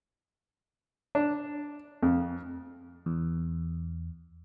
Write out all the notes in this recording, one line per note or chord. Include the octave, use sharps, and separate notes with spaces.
D4
F2
E2